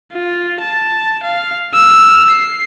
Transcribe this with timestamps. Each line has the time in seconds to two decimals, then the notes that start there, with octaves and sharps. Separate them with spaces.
0.13 F4
0.61 A5
1.23 F5
1.74 E6 F6
2.30 C7